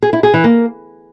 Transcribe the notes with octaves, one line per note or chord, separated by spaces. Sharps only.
G#4
E4
G#4
E3
A#3